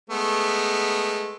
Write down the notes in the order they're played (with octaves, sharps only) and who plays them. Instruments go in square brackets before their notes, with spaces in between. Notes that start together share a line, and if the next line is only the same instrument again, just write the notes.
[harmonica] G#3 A3 B3